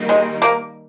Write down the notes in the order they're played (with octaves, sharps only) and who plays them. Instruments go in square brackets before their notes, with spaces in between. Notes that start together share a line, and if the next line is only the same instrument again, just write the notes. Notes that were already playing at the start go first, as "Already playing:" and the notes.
Already playing: [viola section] D#3 G3 A#3 D#4
[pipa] G#3
A#3